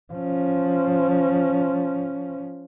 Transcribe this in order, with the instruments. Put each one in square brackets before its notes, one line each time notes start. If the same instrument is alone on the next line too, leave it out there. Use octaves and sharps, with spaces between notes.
[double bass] F3 C#4